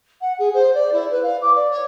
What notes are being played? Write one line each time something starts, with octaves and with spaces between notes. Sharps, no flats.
F#5
G#4
C5
D5
E4
B4
F5
D6
D5
C#5